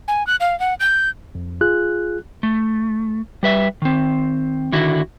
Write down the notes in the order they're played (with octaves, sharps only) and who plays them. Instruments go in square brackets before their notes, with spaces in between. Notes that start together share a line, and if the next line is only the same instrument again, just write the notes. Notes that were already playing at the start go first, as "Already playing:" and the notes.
[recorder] G#5
F#6
F5
F#5
G6
[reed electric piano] F2
F4 G#4 F#6
[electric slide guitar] A3
G3 B4 E5
D#3 C4
D3 D#3 E4 F#4